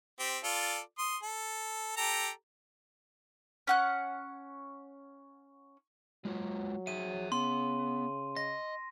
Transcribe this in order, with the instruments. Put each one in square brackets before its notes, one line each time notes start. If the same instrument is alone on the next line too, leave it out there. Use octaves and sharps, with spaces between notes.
[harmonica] C4 G4
F4 A4 D5
C6 D#6
A4
G4 A4 A#5
[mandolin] C#4 F#5 F#6
[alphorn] F#3 [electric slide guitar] G#3 F4 F#4
[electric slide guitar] G#4 C#5 E5 [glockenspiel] D#7
[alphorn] C#3 [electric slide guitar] B3 [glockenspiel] C6
[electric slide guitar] D#5 [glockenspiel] A#6